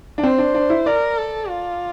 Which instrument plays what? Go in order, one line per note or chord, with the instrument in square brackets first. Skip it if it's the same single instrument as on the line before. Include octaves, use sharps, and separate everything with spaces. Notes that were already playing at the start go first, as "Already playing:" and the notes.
[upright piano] D4
[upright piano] C4 [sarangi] C5
[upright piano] D4
D4
E4
[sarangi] A#4 [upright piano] D5
[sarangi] A4
F4